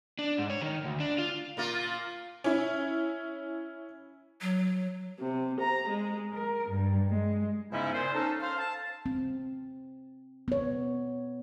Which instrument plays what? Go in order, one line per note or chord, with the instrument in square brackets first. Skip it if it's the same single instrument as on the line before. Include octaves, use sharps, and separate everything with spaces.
[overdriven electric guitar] D4
G#2
C#5
D#3
D2
D4
F4
[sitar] A#2 A#3 F4
[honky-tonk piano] C#4 E4
[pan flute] F#3
[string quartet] C3
A#5
G#3
A#4
G2
G#3
[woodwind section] G#2 C#3 G#3 B3 C#4 E4
A#2 C5
C#4 D#4 A4
C5 F5
A5
[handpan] C4
B3 C#5